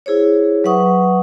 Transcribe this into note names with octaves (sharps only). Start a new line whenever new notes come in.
E4 G#4 C5 C#5
F#3 B4 E5 F#5 C#6 D#6